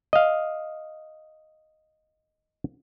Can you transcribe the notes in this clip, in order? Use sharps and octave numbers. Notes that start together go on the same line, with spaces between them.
D#5 F5